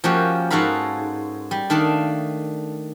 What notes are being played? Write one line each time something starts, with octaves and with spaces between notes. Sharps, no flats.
F3 A#3 C#4 F#4 G4
G#2 F#4 A4 A#4 F5 B5
G3
D#3 A3 D4 F5 A5